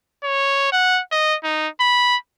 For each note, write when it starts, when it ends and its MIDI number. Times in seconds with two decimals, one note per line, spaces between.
0.23 0.72 73
0.72 1.01 78
1.11 1.36 75
1.44 1.68 63
1.80 2.16 83